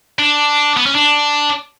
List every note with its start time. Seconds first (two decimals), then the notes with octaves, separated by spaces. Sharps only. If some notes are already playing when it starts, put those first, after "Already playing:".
0.19 D4
0.77 B3
0.86 C#4
0.95 D4